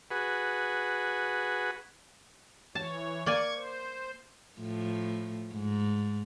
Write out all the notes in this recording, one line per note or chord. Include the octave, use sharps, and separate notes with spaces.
F#4 G#4 B4
E3 C#5 A5
A#3 D5 G#5 C#6 G#6
C5
A2 F3
G#2